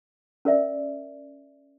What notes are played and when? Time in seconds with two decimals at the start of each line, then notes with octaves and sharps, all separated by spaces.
0.45 C#4 A#4 D5 E5